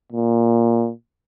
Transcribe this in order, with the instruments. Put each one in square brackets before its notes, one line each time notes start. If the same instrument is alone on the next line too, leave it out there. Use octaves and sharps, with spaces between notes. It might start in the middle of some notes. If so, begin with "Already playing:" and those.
[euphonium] A#2